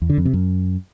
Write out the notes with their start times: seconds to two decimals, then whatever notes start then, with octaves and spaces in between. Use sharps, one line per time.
0.02 E2
0.10 D3
0.18 F2
0.25 C3
0.33 F#2